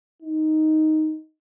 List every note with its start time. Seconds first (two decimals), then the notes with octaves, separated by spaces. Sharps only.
0.22 D#4